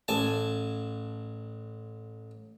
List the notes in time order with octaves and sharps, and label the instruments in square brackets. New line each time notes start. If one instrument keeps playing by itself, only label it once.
[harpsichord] A1 G#5 A5